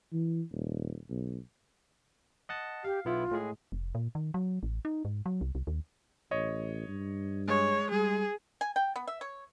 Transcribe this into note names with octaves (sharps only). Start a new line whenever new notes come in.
E3
D#1
B1
D#5 F#5 A5
G4 F5
B1 B3 E4 F4
A2 G#3 G#4
F1
A#2
D#3
F#3
A1
D#4
G#2
F#3
C2
C2
D#2
A1 C#5 D#5
G2
G#3 C#5
G3 G#4
G#5
G5
B3
E5
C#5